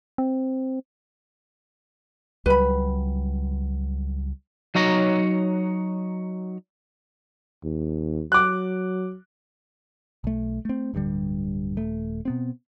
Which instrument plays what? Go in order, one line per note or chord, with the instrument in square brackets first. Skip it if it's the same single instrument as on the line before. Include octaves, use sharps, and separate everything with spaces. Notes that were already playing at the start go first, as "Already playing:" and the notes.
[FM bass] C4
[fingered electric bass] C#2 F#3 G3 [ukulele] B4 B5
[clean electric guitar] F#3 D#4 C#5 A#5
[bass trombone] D#2
[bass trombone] F#3 [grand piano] D6 F#6
[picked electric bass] B1 A3
A3 C4
D1 G2 D3 G3
D#1 A3
B2 B3 C4